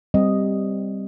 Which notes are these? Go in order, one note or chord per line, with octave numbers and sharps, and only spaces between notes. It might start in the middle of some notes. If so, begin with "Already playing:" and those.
G3 C4 D#5